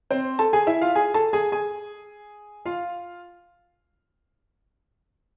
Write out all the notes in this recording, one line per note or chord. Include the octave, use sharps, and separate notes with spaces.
C4 C5
A4 A5
G#4 G#5
E4 E5
F4 F5
G#4 G#5
A4 A5
G#4 G#5
G#4 G#5
F4 F5